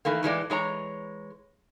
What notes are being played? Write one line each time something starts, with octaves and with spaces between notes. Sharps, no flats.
D#3 E3 A3 A#3
A2 E3 G#3 D5
E3 G#3 C#5 A#5